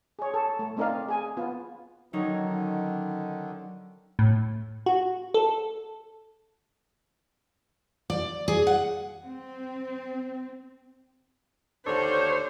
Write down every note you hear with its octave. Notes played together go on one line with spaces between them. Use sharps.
G#4 C#5
A4
A3
A3 C4 D#4 A#4 D5 F5
G#4 G#5
B3 F4
D3 D#3 F#3 C#4 D#4
A2
F#4
A4
D5
G#4
F#5
C4
D#2 D3 D4 A4 C5 C#5 A5